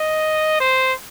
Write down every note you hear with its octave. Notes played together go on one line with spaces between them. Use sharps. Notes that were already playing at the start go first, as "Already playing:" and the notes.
Already playing: D#5
C5